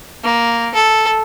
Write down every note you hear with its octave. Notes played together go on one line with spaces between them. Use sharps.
A#3
A4